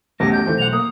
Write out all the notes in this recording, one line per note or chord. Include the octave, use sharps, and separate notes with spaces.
B1 E2 A3 C#4 G4 D6 A#6
G6
E2 E3 A3 C4
B1 F#5 F7
A#3 D#6